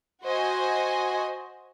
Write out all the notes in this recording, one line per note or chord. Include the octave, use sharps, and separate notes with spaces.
F#4 C5 D#5 G#5